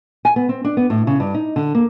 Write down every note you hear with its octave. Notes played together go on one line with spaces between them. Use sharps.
G#5
B3
C4
D4
B3
A2
C#3
G2
D#4
D3
A#3